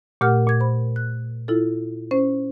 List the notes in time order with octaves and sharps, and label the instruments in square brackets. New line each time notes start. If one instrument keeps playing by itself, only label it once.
[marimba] A#2 A3 G4 A#4 F#5 F6
A#2 G#6
C5 B5
F#6
E4 F4 A4
C#4 C5